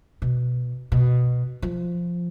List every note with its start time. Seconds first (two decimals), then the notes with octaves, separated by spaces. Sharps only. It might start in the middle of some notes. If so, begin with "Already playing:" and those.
0.22 B2
0.92 B2
1.62 F3